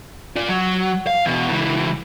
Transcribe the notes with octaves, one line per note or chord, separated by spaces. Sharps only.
F4 D5
F#3
F5
E2 B2
C#2 E3